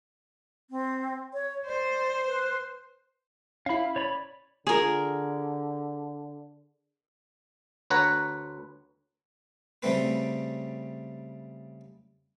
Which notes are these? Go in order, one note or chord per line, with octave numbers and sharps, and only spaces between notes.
C4
C#5
C5 D5
B4
C#4 E4 F5 B5
C#5 D5 B5
D3 F4 G#4 A#4 G#5
D2 B4 C#5 F#5 A#5
C#3 G3 A3 C4 B4